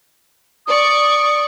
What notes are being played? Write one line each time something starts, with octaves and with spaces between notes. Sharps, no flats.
D5 C#6 D#6